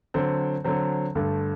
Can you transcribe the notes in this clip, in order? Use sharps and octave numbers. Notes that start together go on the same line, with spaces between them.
D3 F#3 C4
D3 F#3 C4
G2 D3 A3